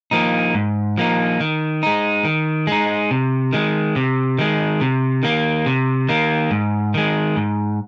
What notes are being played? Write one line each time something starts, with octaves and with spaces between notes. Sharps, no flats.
F3 A#3 D#4
G#2
F3 A#3 D#4
D#3
G#3 D#4
D#3
G#3 D#4
C3
D#3 G#3
C3
D#3 G#3
C3
D#3 A#3
C3
D#3 A#3
G#2
D#3 G#3
G#2